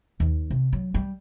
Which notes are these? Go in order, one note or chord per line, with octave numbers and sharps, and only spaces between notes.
D#2
C3
F#3
G3